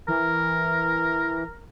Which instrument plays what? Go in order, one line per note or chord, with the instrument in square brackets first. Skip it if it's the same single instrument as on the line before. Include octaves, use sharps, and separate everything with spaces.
[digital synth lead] E3 [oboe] A#4